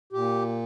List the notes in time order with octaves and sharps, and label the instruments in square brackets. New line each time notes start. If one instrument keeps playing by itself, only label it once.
[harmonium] A#2 G4